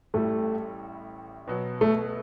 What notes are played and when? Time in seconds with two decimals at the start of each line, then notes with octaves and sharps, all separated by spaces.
0.14 A1 A2 G3 A3
1.47 B2 F#3 B3
1.81 A3